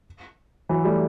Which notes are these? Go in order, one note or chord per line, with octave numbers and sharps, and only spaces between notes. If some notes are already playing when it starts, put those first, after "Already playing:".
E3 F#3
G3 A3